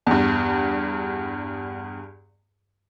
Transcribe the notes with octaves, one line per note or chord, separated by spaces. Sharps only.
E2 G2